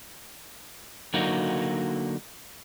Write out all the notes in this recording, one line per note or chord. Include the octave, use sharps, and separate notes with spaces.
D3 F#3 A#3 D#4 F#4